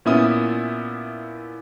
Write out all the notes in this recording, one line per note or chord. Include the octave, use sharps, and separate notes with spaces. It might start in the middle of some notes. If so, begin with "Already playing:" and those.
A#2 B3 C#4 E4 E5 D#6